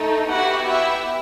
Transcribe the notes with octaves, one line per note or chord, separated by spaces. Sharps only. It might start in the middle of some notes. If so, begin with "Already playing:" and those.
Already playing: A3 D#4 A4
B3 E4 F#4 G4 F#5
E4 E5